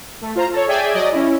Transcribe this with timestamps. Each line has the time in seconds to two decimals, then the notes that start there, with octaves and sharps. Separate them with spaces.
0.21 A3
0.35 F4 C5 A#5
0.52 A4 C#5
0.67 G#4 D5 E5 G5 G#5
0.93 F#3 D5 D#5
1.12 C#4 E4